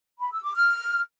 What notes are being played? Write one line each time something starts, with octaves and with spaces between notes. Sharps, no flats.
B5
E6
D6
F6